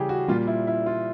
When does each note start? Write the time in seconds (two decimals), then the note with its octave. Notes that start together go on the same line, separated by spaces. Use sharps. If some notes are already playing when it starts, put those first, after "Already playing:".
Already playing: C#3 E3 G3 G4 G#4
0.09 F#4
0.28 A#2 G3 F4
0.47 E4
0.67 E4
0.86 F4